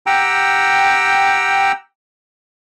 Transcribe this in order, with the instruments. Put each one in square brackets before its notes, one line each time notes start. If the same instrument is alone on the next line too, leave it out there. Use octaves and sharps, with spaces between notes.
[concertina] G4 F#5 G5 A#5 E6